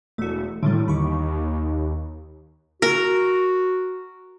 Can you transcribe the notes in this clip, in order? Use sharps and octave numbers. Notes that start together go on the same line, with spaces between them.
E1 A3 F#4
A2 D3 D#3 G3
D#2 B5 C#6 D6
F#4 A#4